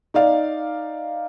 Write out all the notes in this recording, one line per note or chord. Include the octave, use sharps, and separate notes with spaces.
D#4 D5 F5